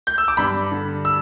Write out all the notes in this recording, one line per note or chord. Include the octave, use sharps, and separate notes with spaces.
G6
E6
D6
G2 B5
D3
E6